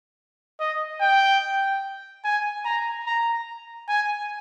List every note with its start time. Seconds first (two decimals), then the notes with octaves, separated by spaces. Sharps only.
0.60 D#5
1.01 G5
2.25 G#5
2.65 A#5
3.07 A#5
3.89 G#5